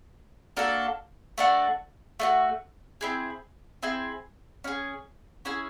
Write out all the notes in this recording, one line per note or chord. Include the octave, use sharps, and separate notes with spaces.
A#3 D4 F#4 A4
A3 D4 F#4
A3 D4 F#4
C4 E4 G#4
C4 E4 G#4
C#4 E4 G#4
C#4 E4 G#4